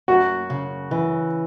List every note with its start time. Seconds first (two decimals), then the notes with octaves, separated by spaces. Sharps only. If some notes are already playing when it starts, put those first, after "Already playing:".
0.08 F#2 F#4
0.50 C#3
0.91 E3